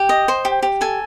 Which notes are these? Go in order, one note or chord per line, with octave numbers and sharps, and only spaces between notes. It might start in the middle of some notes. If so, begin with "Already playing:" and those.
Already playing: G4 G5
D#5
C5
G4
G4
A4 G#5